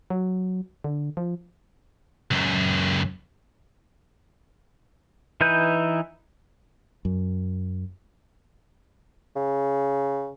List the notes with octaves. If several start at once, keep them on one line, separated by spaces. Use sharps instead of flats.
F#3
D3
F3
C#2 F#2
E3 D#4 E4 B4 G6
F#2
C#3